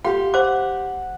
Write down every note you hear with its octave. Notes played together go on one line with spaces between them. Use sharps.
G4 F5 F#5 C6
C5 F#5 D6